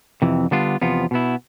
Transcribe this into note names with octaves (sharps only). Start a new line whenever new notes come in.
F2 C3 E3
D3 G3 B3 D4 F4
E2 C3 F3 B3 F4
B2 B3 E4